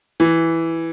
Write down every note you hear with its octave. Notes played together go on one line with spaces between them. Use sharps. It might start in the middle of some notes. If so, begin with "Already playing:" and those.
E3